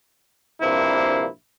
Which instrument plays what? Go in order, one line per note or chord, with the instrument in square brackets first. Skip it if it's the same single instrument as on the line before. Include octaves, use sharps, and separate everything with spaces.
[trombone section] A#1 G2 C3 A#3 E4 C5